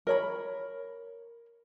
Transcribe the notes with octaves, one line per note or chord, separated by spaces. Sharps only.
A#4 C#5 B5